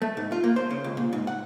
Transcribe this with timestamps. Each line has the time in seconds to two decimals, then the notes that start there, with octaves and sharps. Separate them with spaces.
0.02 A3
0.17 G#2
0.32 F4
0.44 A#3
0.56 C5
0.71 C#3
0.84 C#2
0.97 A#2
1.13 G#2
1.27 F#5